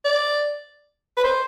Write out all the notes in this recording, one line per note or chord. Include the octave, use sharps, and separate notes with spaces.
D5
B4
C5